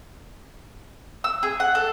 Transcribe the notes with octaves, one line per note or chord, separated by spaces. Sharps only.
E6
G#4
F#5
A4